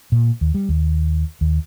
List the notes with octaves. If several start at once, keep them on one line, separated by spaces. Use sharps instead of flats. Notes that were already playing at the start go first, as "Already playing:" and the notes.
A#2
D#2
G3
D#2
D#2